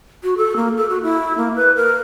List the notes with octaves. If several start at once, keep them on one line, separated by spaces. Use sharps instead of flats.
F#4
A4
A#3
A4
F#4
E4
A#3
B4
A#4